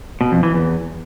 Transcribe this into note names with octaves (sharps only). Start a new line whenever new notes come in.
B2
F2
E3
E2